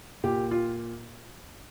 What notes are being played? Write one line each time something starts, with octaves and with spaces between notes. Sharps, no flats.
A#2 G4
F4